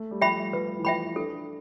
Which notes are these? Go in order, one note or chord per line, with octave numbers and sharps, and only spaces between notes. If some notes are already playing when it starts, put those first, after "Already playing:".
Already playing: A3
G3
F3 E5 G5 B5
G3
F3 B4
E3
F3 E5 G5 B5
D4 A4